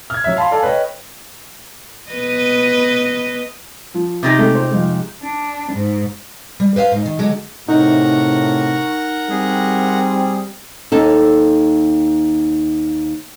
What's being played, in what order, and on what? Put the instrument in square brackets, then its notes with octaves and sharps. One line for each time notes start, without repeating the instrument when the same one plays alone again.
[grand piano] F6 G#6
F#3 E5
F5 A5 B5 C6
A4 D5 F5 G#5 A5
B4 C#5 D#5 G5
[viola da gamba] B3 B4 D#5
[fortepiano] F3
[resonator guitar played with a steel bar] C3 D#4 G4
[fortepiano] G#3 A3 C4
C5
F2 G#3
[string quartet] D4
G#2
[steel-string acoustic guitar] G3
B4 C5 D#5 F5
G#2 D#4
D#3
D3 F#3 G#3
[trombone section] A2 C3 [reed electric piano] D#4 [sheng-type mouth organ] A#4 F#5 A#5 [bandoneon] C#6
[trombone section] G3 C4 [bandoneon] G#4
[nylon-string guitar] D#2 D#4 A4